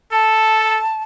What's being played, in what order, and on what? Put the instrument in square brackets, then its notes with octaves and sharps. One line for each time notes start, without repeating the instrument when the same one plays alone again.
[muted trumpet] A4 [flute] A5